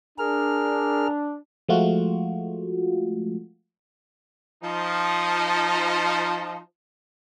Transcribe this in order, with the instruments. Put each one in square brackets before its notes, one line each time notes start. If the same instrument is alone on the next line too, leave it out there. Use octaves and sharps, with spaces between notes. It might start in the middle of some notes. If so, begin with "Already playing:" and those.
[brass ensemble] D4 [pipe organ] G#4 A#4 F6
[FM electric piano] F3 G#3 A3 F4 F#4
[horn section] F3 D#4